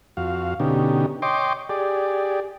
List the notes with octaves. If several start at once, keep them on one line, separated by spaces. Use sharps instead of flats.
F2 F#4 F5
B2 D3 C#4 D#4 G4
C#5 D#5 G5 C6 D6
G4 G#4 D5